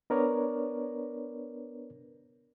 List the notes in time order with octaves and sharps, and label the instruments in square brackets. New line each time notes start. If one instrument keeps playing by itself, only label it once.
[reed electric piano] B3 D4 A#4 B4 C#5 D5